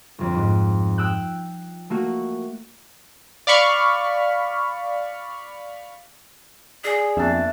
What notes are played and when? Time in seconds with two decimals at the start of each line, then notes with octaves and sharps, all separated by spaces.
0.18 G1 F2
0.35 G#2
0.98 G5 D#6 E6 F#6 G6
1.90 A3 A#3 F#4 F#5
3.47 D5 F5 B5 C#6 F6
6.84 G#4 D5 G#5
7.17 F2 A#3 B3 D4 E5 A6